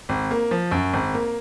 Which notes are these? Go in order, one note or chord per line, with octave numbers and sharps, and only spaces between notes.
G#1
A#3
F3
F#2
G#1
A#3